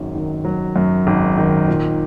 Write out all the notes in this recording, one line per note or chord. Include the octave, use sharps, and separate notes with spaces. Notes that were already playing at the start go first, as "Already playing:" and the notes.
Already playing: G#1 F#2 F#3
D#3
F#3
F#2
G#1
D#3
A#2